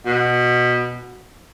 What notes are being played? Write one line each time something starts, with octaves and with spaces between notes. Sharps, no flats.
B2